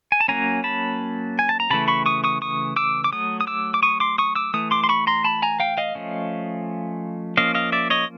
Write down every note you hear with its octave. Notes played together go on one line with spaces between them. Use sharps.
G#5
A5
F#3 A#3 C#4 G#5 A#5
A5 B5
G#5
A5
A#5
C#3 E3 A3 A5 B5
B5 C#6
C#6 D#6
C#6 D#6
C#6 D#6
D6 E6
D6
F#3 A3 D#6
D#6
D6 E6
D6
C#6 D#6
C6 D6
C#6 D#6
D6 E6
E3 A3 D#6
C6 D6
C6
B5 C#6
A#5 C6
A5 B5
G#5 A#5
F5 G5
D#5 F5
F3 A3 C#4
F3 A#3 C#4 D#5 F5
D#5 F5
D5 E5
C#5 D#5